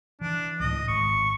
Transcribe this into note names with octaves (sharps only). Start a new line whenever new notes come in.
E3 D4
C#2 A2 D#5
G#1 C#6